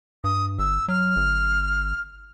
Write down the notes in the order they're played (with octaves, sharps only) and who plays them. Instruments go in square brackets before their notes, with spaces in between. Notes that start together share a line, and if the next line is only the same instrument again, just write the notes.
[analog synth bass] G2 [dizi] D#6
[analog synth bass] G1 [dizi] E6
[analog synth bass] F#3 [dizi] F6
[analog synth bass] G1